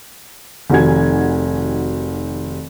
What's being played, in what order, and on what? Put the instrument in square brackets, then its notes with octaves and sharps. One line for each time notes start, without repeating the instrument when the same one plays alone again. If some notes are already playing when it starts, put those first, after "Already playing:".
[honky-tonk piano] F1 D#3 F#4 G#5 G#6